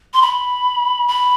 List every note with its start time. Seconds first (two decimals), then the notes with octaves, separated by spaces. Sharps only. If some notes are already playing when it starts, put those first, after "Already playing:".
0.14 C6
0.22 B5
1.08 B5